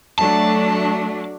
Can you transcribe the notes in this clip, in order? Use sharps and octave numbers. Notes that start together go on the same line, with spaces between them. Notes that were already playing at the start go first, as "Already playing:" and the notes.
F#3 A3 D4 A5